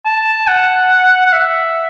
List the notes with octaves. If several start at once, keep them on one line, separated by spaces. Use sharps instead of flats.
A5
F#5
F#5
E5